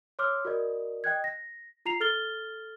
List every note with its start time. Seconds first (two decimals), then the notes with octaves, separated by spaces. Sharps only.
0.19 C#5 C6 D6 E6 F6
0.45 F#4 A#4 D5 D#5
1.04 D#5 G5 F#6 G#6
1.24 A#6
1.86 F4 A#5 C7 F7
2.00 A4 F6 A6 G7